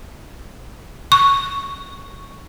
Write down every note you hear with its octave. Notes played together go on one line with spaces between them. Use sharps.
C#6